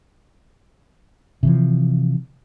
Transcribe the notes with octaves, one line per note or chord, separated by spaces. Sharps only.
C3 E3 F3